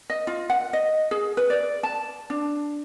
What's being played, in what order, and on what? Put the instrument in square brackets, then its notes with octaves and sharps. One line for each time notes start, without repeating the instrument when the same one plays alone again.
[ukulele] D#5
F4
F#5
D#5
G#4
B4
D5
A5
D4